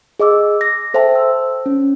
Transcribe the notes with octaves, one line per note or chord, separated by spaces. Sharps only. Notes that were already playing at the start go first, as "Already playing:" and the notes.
G#4 D#5 D6 E6
A#6
A4 C5 E5 G5 A5
E6
C#4